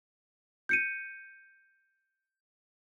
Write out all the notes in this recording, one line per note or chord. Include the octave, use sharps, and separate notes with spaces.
G6 C#7 D#7